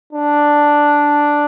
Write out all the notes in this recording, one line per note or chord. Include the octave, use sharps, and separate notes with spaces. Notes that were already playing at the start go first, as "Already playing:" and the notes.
D4